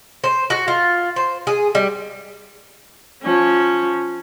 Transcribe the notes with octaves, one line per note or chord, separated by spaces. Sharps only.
C5
F#4
F4
C5
G#4
G3
F3 C#4